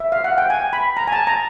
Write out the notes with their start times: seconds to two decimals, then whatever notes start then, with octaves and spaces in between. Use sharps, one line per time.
0.00 E5
0.12 F5
0.24 F#5
0.38 G5
0.50 G#5
0.73 B5
0.97 A#5
1.07 G#5
1.12 A5
1.27 A#5